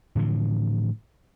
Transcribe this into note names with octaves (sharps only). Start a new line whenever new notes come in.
A2 D3 E3 F3